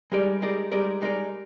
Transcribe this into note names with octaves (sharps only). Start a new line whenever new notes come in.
G3 G#3 D#4 A#4 D5
G3 G#3 D#4 A#4 D5
G3 G#3 D#4 A#4 D5
G3 G#3 D#4 A#4 D5